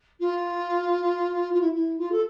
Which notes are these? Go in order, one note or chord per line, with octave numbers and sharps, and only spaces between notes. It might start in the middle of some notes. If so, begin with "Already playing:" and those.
F4
F4
E4
E4
F4
A4